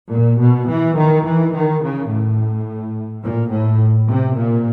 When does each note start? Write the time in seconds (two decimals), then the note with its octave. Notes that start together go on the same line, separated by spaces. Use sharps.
0.11 A#2
0.39 B2
0.67 E3
0.96 D#3
1.25 E3
1.53 D#3
1.82 C#3
2.09 A2
3.23 A#2
3.51 A2
4.08 C3
4.36 A#2